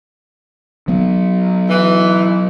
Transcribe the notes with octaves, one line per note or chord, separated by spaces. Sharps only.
F#3 B3
E3